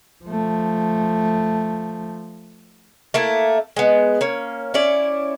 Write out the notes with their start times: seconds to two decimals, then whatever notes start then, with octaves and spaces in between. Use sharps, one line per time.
0.25 F3 A3
3.14 A3 A#3 E4
3.76 G#3 B3
4.21 A#3 C#4
4.74 C#4 E4 D5